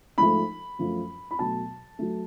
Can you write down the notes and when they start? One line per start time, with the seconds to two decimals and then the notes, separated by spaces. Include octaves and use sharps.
0.18 G#2 F3 A3 B5
0.79 F#2 F3 A3
1.31 B5
1.39 B2 F#3 A3 A5
1.99 F#3 A3